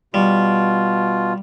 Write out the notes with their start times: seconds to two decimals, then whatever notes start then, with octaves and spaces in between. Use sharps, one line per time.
0.14 B2 G3 F4